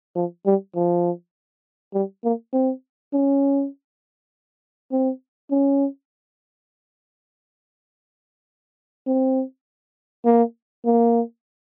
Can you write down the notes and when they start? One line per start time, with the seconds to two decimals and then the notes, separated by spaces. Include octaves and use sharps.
0.16 F3
0.46 G3
0.75 F3
1.94 G3
2.24 A#3
2.53 C4
3.13 C#4
4.92 C4
5.51 C#4
9.07 C4
10.25 A#3
10.85 A#3